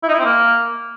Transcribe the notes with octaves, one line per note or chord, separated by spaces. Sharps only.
E4
D#4
E4
C4
A#3